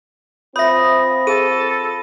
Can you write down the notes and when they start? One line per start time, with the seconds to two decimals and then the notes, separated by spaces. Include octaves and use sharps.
0.56 C4 F4 C#5 E5 B5 D#6 A#6
1.27 G#4 A4 D#7